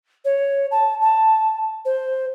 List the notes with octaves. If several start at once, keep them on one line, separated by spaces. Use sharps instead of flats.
C#5
A5
A5
C5